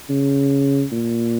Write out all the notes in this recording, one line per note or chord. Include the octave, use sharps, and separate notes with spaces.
C#3
A#2